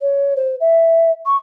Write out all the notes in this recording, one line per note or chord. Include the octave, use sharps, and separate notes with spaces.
C#5
C5
E5
C#6